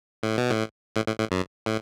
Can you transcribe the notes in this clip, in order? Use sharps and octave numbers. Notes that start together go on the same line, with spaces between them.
A2
B2
A2
A2
A2
A2
F#2
A2